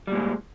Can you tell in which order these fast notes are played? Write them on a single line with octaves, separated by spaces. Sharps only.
G3 A#2 G#3